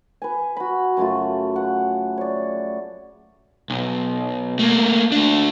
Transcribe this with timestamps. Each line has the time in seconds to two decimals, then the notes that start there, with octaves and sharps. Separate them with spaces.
0.22 B4 G#5
0.57 F#4 B5
0.97 F#2 C#3 A3 F4
1.56 F#5
2.18 C#5 D5
3.70 B1
4.59 A3 A#3
5.12 A3 D4